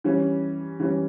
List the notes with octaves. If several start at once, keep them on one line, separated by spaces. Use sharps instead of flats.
E3 G3 C#4
E3 G3 C#4